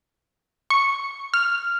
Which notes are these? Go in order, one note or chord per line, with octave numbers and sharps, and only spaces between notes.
C#6
F6